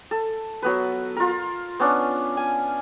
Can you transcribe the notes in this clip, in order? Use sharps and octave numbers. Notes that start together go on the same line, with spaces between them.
A4
F#3 B3 B4
F4 A#4
B3 C#4 D4
G#5